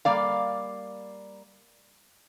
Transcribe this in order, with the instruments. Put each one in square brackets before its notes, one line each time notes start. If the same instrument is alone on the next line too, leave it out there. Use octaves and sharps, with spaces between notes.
[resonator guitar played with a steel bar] G3 A#3 D5 F5